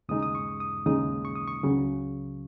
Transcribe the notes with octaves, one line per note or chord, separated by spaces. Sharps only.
D#2 C#3 G#3 D#4 D#6
D#6
C#6
D#6
D#2 C#3 G#3 D#4 D#6
C#6
D#6
C#6
C#2 C#3 F#3